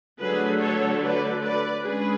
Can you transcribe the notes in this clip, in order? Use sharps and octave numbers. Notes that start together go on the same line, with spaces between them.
D3 F#3 A3 G#4 B4
A4 C#5
B4 D5
B4 D5
D3 G#3 C#4 G#4 B4